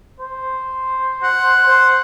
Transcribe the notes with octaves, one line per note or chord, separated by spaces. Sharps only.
C5
F#5
C5